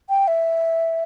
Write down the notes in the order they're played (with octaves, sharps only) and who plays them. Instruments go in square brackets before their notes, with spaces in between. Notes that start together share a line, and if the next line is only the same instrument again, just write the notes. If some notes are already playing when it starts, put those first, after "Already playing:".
[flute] G5
E5